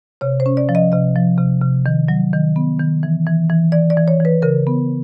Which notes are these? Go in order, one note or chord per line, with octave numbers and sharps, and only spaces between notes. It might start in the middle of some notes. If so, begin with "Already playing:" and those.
C3 C#5
C5
C#4
D5
F3
D#5
C3 D#5
F3
C3
C3
D#3
F#3
D#3
B3
D#3
E3
E3
E3
E3 D5
D5
E3
C#5
E3 B4
C#3 A#4
B3